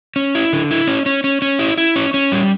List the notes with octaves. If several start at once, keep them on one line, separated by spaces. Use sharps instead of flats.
C#4
E4
D3
E4
C#4
C#4
C#4
C#4
E4
E4
C#4
C#4
G3